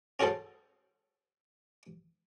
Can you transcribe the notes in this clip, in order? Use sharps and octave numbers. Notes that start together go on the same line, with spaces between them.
C#4 F#4 G#4 A4 C5